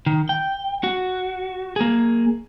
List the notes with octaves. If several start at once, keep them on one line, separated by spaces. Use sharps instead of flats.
D#3
G5
F#4
A#3 G#4